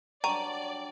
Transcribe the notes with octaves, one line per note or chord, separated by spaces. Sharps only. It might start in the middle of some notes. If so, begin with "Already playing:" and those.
F#3 G3 D4 D5 G5 A#5 C#6 D#7